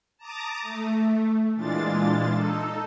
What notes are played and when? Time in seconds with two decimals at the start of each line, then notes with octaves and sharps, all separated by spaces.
0.18 A5 A#5 D6 D#6
0.61 A3
1.55 A#2 E3 G#3 D4 F4 A6
2.29 D#4 A4